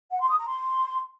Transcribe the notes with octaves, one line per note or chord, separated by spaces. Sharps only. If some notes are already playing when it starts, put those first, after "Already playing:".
F#5
C6
D#6
A#5
C6